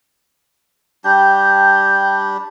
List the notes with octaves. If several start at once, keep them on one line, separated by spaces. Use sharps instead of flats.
G3 D4 G5 G6